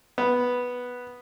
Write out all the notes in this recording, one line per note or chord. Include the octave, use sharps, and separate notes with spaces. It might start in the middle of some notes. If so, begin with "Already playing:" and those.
B3